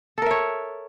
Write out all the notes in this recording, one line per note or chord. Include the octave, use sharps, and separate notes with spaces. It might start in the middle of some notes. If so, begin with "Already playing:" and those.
A4 A#4 C#5 E5